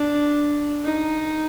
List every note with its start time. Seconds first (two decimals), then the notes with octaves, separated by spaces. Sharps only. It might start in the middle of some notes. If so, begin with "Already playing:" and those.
Already playing: D4
0.85 D#4